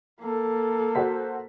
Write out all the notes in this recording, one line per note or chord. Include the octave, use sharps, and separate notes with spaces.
A#3 A4
F#4 C5 B6